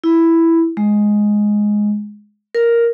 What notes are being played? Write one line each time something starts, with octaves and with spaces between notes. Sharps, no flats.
E4
G#3
A#4